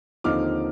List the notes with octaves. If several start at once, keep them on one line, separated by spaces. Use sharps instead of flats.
D#2 D3 F3 C4 D#4 D6 F6